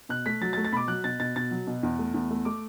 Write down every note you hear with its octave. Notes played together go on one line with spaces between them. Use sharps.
B2 F#6
A3 B6
F#3 A6
A6
A3
A6
B2 B5 D6
F#3 F#6
B2 A6
B2 A6
B2 A6
F#3
B2
E2
A3
E2
A3
A3 D6